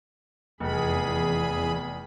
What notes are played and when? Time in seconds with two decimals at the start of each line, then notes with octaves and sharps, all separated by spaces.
0.60 F1 E2 G#4 B5